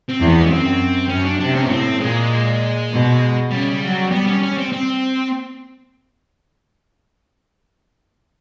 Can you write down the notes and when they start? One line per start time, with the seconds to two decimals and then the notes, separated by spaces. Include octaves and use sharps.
0.09 C4
0.20 E2
0.29 B3
0.46 C#4
0.49 F#2 C4
1.09 F#2 C#4
1.25 D4
1.40 C3 D4
1.55 C#4
1.63 B3
1.70 A2 C4
2.00 A#2 G#3
2.91 B2
3.51 C#3 G3
3.82 F#3
4.12 G3 B3
4.27 C#4
4.43 C#4
4.58 C4
4.72 C4